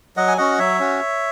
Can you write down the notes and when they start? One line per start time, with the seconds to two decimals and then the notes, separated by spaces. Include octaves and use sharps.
0.17 F#3 D#5 F#5
0.28 G#5
0.38 C#4 F#4 D#5 F#5
0.58 F#3 C#5 E5
0.80 C#4 F#4